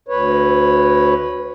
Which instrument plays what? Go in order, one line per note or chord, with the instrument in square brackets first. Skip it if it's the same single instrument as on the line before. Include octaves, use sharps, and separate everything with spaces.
[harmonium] D2 B4 C#5